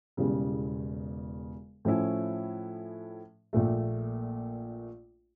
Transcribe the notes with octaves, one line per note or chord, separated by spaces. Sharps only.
E1 E2 C#3 G3
A2 F3 C#4 E4
A#1 A#2 A3